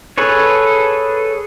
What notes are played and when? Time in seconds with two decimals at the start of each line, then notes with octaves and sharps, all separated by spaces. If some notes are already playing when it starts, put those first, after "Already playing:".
0.18 G#4 A4 B4 C#5